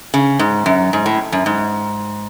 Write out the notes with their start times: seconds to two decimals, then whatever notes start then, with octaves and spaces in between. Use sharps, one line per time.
0.14 C#3
0.39 G#2
0.66 F#2
0.93 G#2
1.06 A2
1.32 F#2
1.46 G#2